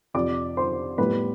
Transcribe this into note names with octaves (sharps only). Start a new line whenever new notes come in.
F2 C3 F3 D5 D6
C5 C6
A2 G3 B3 B4 B5